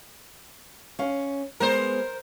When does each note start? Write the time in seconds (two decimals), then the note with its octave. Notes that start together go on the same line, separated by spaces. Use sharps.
0.99 C#4 F5
1.60 G#3 B3 A#4 C5